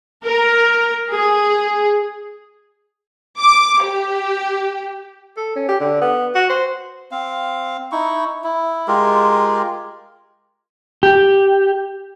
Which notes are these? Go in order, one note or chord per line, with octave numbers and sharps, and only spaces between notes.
A#4
G#4
D6
G4
A4
C#4
G4
D3
B3
F#4
C5
C4 F5
D#4 E4 C#6
E4
G#3 F4 G4 A#4
G4